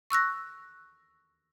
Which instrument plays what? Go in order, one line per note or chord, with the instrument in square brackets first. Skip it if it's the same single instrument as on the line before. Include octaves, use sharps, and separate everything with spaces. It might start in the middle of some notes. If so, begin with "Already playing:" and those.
[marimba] C#6 E6 F#6 A#6